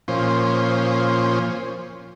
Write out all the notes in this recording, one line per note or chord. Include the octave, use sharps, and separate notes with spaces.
A#2 F3 C#4 C5